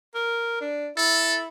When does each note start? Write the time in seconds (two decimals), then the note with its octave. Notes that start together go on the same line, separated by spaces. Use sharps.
0.15 A#4
0.61 D4
0.97 E4 A4